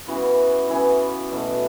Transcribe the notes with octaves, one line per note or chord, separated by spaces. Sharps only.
C#3 E3 B3 E4 F#4
C#3 E3 B3 E4 G#4
B2 F#3 A3 E4